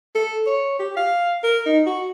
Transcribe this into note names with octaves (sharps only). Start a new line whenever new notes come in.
A4
C#5
G4
F5
A#4
D#4
F#4